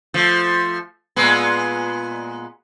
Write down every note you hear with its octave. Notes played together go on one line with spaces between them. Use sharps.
F3 A3
A#2 G#3 B3